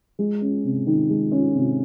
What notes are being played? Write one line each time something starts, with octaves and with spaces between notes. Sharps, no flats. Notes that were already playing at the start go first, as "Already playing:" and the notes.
G#3
C#4
C3
D#3
G#3
C#4
C3